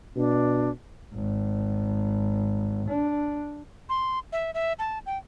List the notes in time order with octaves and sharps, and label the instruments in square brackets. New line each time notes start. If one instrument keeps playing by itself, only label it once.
[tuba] B2 [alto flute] D4
[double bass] G#1
D4
[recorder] C6
E5
E5
A5
G5